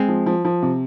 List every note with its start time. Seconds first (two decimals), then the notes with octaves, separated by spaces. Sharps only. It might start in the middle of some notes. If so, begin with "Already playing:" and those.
Already playing: G#3 C4
0.08 F3
0.26 F3
0.45 F3
0.62 C3